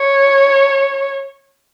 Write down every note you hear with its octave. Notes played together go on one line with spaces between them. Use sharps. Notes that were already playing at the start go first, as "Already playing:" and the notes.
Already playing: C#5